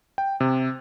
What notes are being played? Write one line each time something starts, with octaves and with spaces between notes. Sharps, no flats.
G5
C3